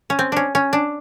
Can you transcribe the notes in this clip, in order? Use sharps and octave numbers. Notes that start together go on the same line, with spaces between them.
C#4
C4
C#4 D4
C#4
D4